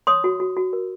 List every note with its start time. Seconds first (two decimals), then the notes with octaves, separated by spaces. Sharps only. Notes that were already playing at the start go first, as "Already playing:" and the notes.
0.07 C#5 C6 D#6
0.24 F#4
0.40 F#4
0.57 F#4
0.73 A#4